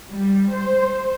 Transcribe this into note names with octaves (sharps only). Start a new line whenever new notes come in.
G3
C5